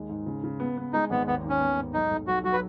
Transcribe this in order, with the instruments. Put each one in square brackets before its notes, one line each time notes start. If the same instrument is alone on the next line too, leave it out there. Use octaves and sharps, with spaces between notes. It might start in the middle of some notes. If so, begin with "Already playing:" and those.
Already playing: [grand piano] D#2 G#3
G#2
C#3
C#3
B3
B3
[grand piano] G#3 [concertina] D#4
[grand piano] G#1 [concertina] B3
[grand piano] D#2 [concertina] B3
[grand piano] D#2
[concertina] C#4
[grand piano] B3
G#2
[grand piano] B1 [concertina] D#4
[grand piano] B1
[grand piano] B1 [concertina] F#4
[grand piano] F#3 [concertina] F#4
[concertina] B4